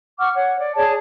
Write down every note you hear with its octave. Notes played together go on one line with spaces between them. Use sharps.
F#5 C#6 D6 F6
C#5 F#5
D5
G#4 C#5 D5 A5